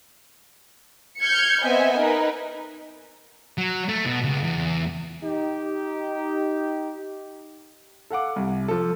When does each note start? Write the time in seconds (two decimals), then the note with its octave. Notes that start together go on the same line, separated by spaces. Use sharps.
1.20 F6 G6 G#6 C#7
1.63 B3 C4 D#5 E5 G#5
1.96 D#4 A#4 B4
3.58 F#3
3.89 A3
4.05 B2
4.23 C#2
4.44 E2
5.24 D#4 G4
8.10 A4 F5 F#5 D6
8.36 C2
8.68 F3 A4